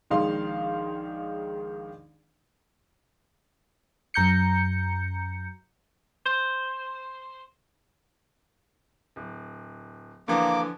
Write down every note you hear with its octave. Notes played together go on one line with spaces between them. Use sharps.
A#1 D#3 G#3 D#4 F5 C6
F#2 A#5 G6 C#7
C5
D1
D3 E3 F3 A#3 D6